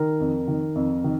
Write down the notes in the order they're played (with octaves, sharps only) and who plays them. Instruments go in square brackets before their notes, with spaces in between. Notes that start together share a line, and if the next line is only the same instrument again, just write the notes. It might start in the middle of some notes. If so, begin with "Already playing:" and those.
Already playing: [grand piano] D#3 A#4
F2
D#3
F2
D#3